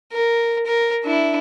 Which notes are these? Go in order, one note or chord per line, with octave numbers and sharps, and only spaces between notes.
A#4
A#4
D4 E4